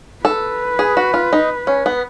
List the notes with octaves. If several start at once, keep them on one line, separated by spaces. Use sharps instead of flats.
A4 B4
G#4
F#4
F4
D#4
C#4
B3